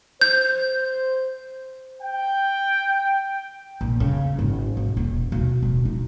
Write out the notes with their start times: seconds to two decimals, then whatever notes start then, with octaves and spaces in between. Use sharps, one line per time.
0.21 C5 G6
2.02 G5
3.81 A#1
4.00 C#3
4.39 G#1
4.77 B1
4.97 D#1
5.32 B2
5.63 D1
5.85 D#4